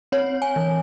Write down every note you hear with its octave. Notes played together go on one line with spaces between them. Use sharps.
C4 C#5
G#5
E3